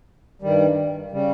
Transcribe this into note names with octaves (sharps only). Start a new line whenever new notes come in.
G2 D#3 G3
C#3 G3